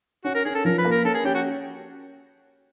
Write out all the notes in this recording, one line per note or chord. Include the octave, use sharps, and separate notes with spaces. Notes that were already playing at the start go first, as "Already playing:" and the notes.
C#4 F#4
A#4
C#4 G#4
A4
F3 A#4
B4
A#3
A#4
C#4 A4
G#4
C#4 G4
F#4